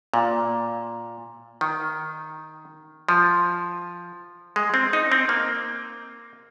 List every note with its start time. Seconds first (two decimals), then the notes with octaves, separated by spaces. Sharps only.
0.14 A#2
1.61 D#3
3.09 F3
4.56 G#3
4.74 C4
4.93 D#4
5.12 C4
5.29 A#3